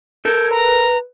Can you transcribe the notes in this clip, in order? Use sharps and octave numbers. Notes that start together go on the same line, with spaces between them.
A4 A#4 G6 G#6
B4 A#5